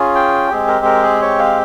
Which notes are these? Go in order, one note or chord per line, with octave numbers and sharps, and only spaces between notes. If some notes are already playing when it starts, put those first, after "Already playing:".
Already playing: C#4 F4 G#4
G5
G#3 C4 G4 G#4
A#4
A#4
G#4
C#5
F5